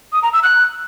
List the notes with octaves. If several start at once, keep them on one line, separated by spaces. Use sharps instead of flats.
D#6
A#5
E6
F#6